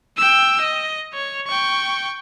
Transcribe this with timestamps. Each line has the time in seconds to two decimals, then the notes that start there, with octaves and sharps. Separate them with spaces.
0.17 G5 E6
0.61 D#5
1.14 C#5
1.47 G5 C#6